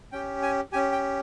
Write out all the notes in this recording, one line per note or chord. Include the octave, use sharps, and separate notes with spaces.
C#4 G4 G5
G#5
C#4 G4 G#5
G5